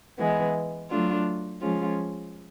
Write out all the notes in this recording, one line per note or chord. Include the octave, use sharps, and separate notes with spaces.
E3 G#3 B3
F#3 A3 D4 F4
F3 G#3 C#4 F4